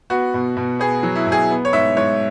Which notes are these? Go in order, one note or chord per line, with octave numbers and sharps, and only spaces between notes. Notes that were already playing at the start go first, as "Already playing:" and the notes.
B3 F#4
B2
B2
B3 G#4
F#3
E4
B2
G#4
B3
C#5
G#2 E5
G#2 C#5